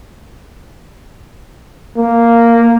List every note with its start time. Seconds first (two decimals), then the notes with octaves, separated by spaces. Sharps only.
1.97 A#3